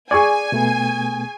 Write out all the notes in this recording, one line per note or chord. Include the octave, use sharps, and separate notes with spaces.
G#4 D5 G#5 C#6 G#6
B2 A3 B3